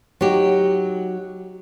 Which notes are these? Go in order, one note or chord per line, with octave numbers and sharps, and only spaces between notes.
F#3 D#4 G4